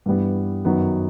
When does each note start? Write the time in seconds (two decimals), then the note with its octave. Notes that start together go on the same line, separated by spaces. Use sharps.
0.06 G2 E3 G3 B3
0.65 F#2 D#3 F#3 B3